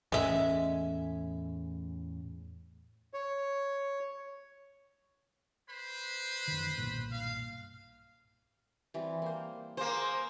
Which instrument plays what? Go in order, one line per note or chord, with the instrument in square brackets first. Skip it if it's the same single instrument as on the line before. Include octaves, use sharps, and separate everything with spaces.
[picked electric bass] E2 A2 C#4 [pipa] G#3 E5
[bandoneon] C#5
[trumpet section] B4 C5 B5
[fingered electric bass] F#2 D#3
B1 G2 A#2
[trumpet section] F5
[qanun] E3 G3 C4
A#3 C5
[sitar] A#3 C5 [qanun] G#4